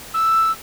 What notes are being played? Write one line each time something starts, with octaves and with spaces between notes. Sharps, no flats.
E6